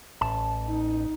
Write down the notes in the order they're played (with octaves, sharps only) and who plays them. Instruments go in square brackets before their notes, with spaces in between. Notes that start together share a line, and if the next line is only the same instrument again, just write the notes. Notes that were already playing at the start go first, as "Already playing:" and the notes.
[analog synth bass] A1 [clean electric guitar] A5
[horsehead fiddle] D#4